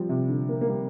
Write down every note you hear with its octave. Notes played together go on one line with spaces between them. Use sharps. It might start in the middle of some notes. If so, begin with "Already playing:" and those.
Already playing: F3 G3
C3
D3
A#3
A#3
G3